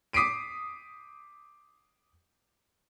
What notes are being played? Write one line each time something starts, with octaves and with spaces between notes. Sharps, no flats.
D6 D#6 B6 C7 D7 D#7